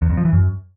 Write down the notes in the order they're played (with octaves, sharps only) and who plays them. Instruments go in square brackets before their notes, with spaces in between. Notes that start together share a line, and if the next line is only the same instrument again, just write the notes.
[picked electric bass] E2
F2
F3
E3
F#2